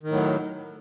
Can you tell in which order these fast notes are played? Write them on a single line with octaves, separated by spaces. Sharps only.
D#3 A2 F#3